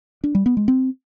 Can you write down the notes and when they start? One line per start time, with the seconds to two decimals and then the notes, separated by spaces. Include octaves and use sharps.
0.24 D4
0.35 G3
0.46 B3
0.57 G#3
0.68 C4